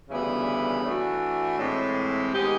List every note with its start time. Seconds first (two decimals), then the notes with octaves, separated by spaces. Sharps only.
0.10 D2 C#3 E3 G3 B3
0.84 E3 A3 D4 F#4
1.59 A2 E3 G#3 C4
2.33 D#3 G#3 B3 D#4 G4